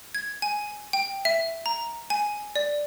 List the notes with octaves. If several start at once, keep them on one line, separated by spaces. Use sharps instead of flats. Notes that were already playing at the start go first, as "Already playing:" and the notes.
G#6
G#5
G5
E5
A#5
G#5
D5